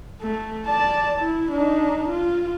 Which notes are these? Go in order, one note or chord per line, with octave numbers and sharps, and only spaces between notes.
A3
D5 A5
E4
D4 D#4
F4